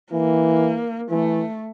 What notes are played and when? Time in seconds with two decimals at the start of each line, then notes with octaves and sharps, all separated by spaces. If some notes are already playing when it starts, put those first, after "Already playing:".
0.12 E3 A#3
1.10 E3 A3